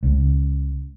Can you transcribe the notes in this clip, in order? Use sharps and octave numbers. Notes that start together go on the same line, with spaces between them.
C#2